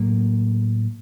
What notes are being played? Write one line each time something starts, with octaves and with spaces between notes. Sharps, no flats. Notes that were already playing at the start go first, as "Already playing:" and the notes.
Already playing: A2 F#3 A#3